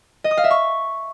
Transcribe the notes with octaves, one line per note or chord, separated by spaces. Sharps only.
D#5
D#6
F5
E5
C#6